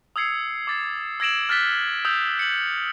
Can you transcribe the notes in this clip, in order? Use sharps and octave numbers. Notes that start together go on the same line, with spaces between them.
D#6 E6 G#6 C7 C#7
D6 A6 C7
E6 G#6 A#6 D7 E7 F#7
F6 F#6 A6 B6 G7
D#6 E6 G6
C#7 F#7